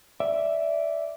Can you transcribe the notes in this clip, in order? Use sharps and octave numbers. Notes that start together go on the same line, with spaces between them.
D5 E5